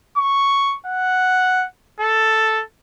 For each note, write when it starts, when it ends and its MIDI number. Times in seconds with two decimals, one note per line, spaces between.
0.17 0.76 85
0.86 1.66 78
2.00 2.63 69